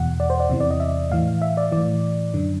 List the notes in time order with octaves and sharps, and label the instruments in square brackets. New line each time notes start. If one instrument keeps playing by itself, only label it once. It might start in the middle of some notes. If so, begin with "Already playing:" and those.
Already playing: [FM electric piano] E2 B2 F#5
D5
C5
D5
E2 C3 E3
D5
D#5
E5
A2 E3 F5
E5
D5
A2 E3 D5
F#2 D3